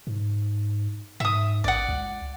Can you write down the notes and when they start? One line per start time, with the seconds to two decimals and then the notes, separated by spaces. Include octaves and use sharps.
0.07 G#2
1.20 G#2 E5 D#6
1.64 A1 D5 F#5
1.88 C#2